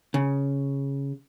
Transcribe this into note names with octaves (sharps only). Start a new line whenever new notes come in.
C#3